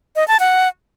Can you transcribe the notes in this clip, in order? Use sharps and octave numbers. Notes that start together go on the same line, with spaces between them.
D#5
A5
F#5